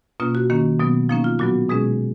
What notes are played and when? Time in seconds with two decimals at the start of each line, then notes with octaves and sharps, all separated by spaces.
0.20 B2 A#3 C#4 F4
0.35 F#4
0.50 D#3 A#3 C#4
0.80 B2 F#3 B3
1.09 F3 A#3 C#4 D#4
1.24 F4
1.39 A#2 F#3 B3 F#4
1.69 B2 G#3 C#4 G#4